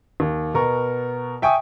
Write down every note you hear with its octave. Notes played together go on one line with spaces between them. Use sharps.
D#2
B2 B3 A#4 C#6
E5 G5 G#5 C#6 D#6